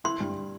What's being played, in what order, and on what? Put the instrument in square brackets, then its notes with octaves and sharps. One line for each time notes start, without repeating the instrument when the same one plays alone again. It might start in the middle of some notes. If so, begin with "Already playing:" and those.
[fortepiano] E4 [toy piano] C6
[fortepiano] G2